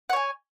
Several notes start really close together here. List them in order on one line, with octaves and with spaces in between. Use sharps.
F#5 C#5 G#5